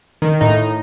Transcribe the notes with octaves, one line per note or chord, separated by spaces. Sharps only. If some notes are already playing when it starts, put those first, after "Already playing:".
D#3
A2 D#4